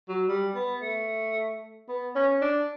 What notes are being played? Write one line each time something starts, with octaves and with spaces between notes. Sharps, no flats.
F#3
G3
B3
A3
B3
C#4
D4